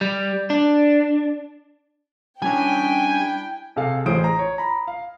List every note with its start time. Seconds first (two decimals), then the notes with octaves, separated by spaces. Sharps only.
0.01 G3
0.50 D4
2.42 G3 C#4 D4 E4 C#5 G5 G#5
3.76 C3 G#4 A4 F5
4.06 A1 E3 G#4 C5 D#6 D7
4.24 A#5
4.39 C#5
4.58 A#5 B5
4.88 F5